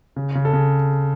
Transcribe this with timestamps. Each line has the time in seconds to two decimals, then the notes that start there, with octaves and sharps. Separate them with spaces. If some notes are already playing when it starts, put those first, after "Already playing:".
0.16 C#3
0.35 C#3
0.45 A4
0.53 C#3